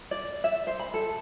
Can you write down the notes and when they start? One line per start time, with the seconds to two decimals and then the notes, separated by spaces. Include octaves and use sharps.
0.11 D5
0.44 E5
0.67 C5
0.79 B5
0.94 A4